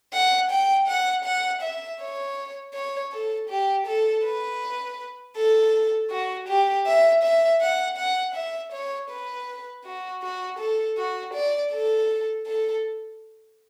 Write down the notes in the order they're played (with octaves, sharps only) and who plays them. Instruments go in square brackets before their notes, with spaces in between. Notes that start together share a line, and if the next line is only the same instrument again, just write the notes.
[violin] F#5
G5
F#5
F#5
E5
C#5
C#5
A4
G4
A4
B4
A4
F#4
G4
E5
E5
F#5
F#5
E5
C#5
B4
F#4
F#4
A4
F#4
D5
A4
A4